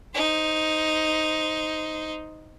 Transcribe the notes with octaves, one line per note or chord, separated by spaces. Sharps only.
D#4 C5